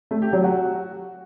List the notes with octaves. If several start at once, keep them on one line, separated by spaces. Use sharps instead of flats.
A3
G4
F#3
F#4